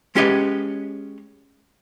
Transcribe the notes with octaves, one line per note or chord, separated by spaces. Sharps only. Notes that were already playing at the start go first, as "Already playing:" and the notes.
G#3 C#4 G4 B4 C#5 D#5